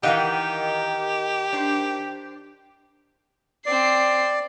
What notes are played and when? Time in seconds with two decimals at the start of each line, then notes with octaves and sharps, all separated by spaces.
0.03 D#3 E3 D#4 G4 F5 F#5
1.53 D4 C5
3.66 C4 D5 C7